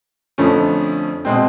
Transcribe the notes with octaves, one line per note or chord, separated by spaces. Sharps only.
F2 D3 F3 A3 C#4
B2 G#3 C4